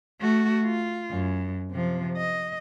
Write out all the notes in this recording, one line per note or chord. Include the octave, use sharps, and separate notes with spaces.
A3 F#4
F4
F#2
C3 F3
D#5